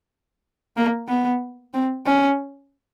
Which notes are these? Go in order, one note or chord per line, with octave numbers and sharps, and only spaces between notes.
A#3
B3
C4
C#4